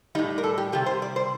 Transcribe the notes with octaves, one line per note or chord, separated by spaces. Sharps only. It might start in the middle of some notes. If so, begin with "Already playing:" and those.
A2 G3 D#4
A#4
A4
G4
C3 G3 G4
C5
D5
C5